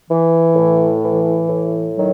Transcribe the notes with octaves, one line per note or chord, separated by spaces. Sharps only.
E3
A2
E3
A2
D#3 F#3